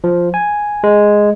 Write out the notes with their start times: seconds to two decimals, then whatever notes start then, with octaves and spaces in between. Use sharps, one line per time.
0.04 F3
0.34 G#5
0.84 G#3